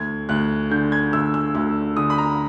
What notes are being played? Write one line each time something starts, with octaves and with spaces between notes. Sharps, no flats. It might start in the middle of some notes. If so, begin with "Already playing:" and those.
Already playing: D2 G#6
D2 F#6
D3 G6
G#6
D2 E6
E6
D2 E6
D3 D#6
B5
A#5